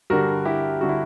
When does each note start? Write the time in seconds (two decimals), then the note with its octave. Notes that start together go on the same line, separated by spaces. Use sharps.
0.10 G2 D3 G3 F#4 A#4
0.45 E4 G4
0.81 D3 G3 F#4
0.89 E4